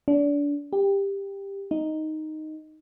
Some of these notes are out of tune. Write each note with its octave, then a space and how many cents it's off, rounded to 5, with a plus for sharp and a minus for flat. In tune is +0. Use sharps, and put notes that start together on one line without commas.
D4 -30
G4 +15
D#4 +0